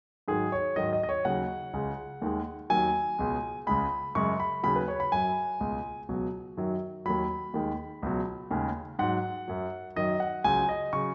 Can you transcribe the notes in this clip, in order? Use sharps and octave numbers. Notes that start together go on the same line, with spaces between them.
G#2 D#3 F#3 G#4
C#5
G#2 D#3 F#3 D#5
D#5
D#5
C#5
D#2 C#3 F#3 F#5
C#2 C#3 G#3
D#2 D#3 G#3
D#2 D#3 F#3 G#5
C#2 B2 G#3
C#2 C#3 G#3 B5
F#2 C#3 G#3 C#6
B5
D#2 C#3 F#3 B5
B4
C#5
B5
F#2 F#3 G#5
C#2 B2 G#3
C#2 B2 F#3
F#2 D#3 F#3
D#2 D#3 F#3 B5
D#2 D#3 G#3
C#2 B2 F#3
D#2 C#3 G#3
G#2 F#3 F#5
F#2 F#3
F#2 D#3 F#3 D#5
F#5
C#2 C#3 F#3 G#5
D#5
C#3 F#3 C#6